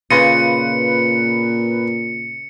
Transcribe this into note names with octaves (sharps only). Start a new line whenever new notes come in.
A#2 C#3 F4 B4 D#5 C#7 D#7